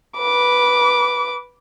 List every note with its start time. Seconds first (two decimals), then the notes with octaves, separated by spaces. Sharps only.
0.18 B4 D6